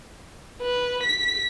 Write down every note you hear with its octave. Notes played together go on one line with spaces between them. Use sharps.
B4
B6